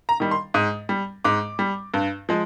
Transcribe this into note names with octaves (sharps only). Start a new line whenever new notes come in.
A#5
D#3 G3
C6
G#2 D#6
G3
G#2 D6
G3
G2
F3 G#3